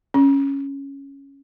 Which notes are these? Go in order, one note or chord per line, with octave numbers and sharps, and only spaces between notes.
C#4